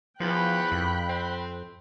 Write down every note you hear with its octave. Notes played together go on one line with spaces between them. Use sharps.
E2 F3 G5 B5 F#6
F2
C4